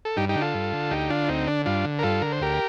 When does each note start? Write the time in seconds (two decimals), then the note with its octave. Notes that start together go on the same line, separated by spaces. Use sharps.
0.05 A4
0.17 G2 D#4 G4
0.29 D#4 G4
0.36 D3
0.41 F4 A4
0.54 G2
0.73 D3
0.91 D2 D#4 G4
1.10 D3 D4 F4
1.28 D2 C4 D#4
1.47 D3 D4
1.66 G2 D4 F4
1.85 D3
1.99 A#4
2.03 G2 F4 A4
2.21 D3 A#4
2.32 C5
2.41 D2 G4 A#4